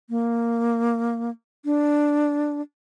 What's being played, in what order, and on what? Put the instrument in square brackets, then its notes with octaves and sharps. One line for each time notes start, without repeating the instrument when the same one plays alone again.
[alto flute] A#3
D4